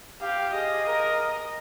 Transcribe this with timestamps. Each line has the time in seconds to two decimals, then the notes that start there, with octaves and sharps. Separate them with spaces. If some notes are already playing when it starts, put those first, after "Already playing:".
0.21 G4 F5
0.54 G#4 D#5
0.87 A#4